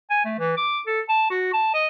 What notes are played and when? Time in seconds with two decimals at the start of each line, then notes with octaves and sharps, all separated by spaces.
0.10 G#5
0.25 A3
0.39 E3
0.57 D6
0.87 A4
1.09 A5
1.31 F#4
1.53 A5
1.74 D#5